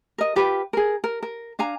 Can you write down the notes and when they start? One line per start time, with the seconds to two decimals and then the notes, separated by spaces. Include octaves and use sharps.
0.18 A#4 D#5
0.36 F4 G4 B4
0.73 G#4 A#4
1.04 A#4
1.22 A#4
1.59 D4 F5 G#5 A#5